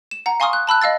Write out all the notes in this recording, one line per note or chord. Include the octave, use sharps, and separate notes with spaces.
E7
F#5 A#5
F5 G#5 C6 C#6 D#6 F6
F#6
A5 B5 E6 F#6
D#5 F5 E6 A6